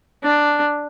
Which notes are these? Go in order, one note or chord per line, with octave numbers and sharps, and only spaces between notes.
D4